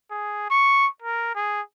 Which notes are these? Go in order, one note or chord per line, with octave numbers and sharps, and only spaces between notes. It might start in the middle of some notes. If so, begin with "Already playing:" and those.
G#4
C#6
A#4
G#4